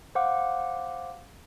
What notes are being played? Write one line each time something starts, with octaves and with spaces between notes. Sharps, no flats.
C5 F5 F#5 D6